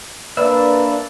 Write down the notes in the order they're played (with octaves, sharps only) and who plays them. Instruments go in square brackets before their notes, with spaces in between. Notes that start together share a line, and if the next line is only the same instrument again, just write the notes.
[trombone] A#3 [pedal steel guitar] D4 E5 [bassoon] B4 [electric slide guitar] D5